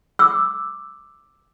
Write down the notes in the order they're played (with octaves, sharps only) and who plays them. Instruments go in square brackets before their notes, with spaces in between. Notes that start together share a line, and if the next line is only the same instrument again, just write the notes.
[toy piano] D6 E6